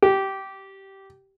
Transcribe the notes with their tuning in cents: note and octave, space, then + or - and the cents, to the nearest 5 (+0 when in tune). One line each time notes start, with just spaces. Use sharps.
G4 -15